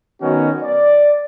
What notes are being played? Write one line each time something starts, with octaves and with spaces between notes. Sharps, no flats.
D#3 F#3 B3 C#4 F#4
D5